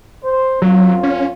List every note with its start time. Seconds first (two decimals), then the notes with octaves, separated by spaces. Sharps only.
0.23 C5
0.62 F#2 F#3 C4 F4
1.03 C#4